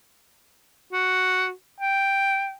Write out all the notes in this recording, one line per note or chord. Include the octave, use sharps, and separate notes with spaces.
F#4
G5